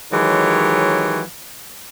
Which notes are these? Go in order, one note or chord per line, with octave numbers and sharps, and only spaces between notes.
D#3 E3 F#3 G#3 G4 C#5